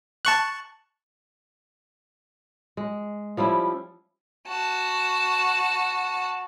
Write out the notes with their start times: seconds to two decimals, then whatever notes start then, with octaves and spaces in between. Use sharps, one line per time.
0.25 A5 C#6 F#6
2.77 G#3
3.37 F3 G3 C#4 E4
4.48 F#4 A5